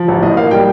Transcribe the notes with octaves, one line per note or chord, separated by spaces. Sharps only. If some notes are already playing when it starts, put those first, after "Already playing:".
Already playing: F3
A1
A2 D#5
A#3 F5
G3 G5